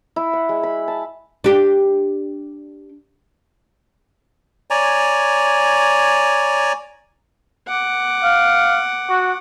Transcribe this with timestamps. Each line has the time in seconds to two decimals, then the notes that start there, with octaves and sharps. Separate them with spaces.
0.16 E4
0.33 F#5
0.49 G#3
0.63 B5
0.88 A5
1.44 D4 G4
4.70 C#5 D5 G#5 A#5
7.68 F#5 D6
8.24 F5
9.09 F#4